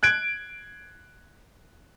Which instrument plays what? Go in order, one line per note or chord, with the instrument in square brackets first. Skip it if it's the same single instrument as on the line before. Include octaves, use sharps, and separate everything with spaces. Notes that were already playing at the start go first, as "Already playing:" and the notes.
[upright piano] F#6 G#6 D7